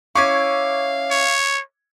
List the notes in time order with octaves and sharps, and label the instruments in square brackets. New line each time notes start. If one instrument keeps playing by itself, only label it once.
[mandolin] C#4 E4 [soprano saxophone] F5 [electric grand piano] C#6 D6 G#6
[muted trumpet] C#5